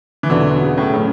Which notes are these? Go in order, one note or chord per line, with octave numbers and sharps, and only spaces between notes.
E3
E2 B2 D3 F#3 B3 E4
C#3
A2
A2 C#3 F#3 A3 C#4